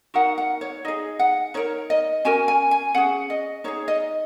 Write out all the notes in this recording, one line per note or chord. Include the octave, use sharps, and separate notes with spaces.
D#4 F#4 A#4 F#5
F#5
C#5
D#4 G#4 D#5
F#5
D#4 A#4 C#5
D#5
C#4 F#4 A#4 G#5
G#5
G#5
C#4 G#4 F#5
D#5
D#4 G#4 C#5
D#5